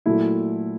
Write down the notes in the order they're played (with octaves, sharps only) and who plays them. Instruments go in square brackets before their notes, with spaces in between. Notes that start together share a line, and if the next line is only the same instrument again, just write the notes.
[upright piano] A#2 F#3 A3 E4